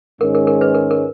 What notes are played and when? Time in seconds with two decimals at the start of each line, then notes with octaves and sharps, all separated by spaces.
0.21 G#2 D#3 G#3 C#4 A#4
0.35 A#4
0.47 A#4
0.61 B4
0.74 A#4
0.91 A#4